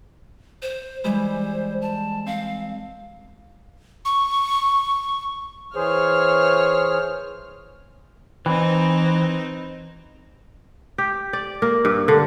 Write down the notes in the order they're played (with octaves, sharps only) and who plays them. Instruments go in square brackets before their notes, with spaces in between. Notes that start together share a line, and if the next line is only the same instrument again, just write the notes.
[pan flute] C5
[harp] E3 G3 G#3 [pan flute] C5
[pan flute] A5
[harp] C4 [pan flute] F5
[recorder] C#6
[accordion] E3 G#4 C5 [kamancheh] C#5 F6
[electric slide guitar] E3 [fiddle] C4 D#4
[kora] G4
D5
A#3
G2
D3